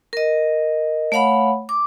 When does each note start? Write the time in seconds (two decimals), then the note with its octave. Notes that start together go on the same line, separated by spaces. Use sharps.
0.13 A#4 D#5
1.12 A3 C#5 F5 F#5 B5
1.69 D6